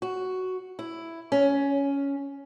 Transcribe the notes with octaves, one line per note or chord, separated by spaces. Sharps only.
F#4
E4
C#4